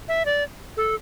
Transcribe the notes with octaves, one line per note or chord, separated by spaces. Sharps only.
E5
D5
A4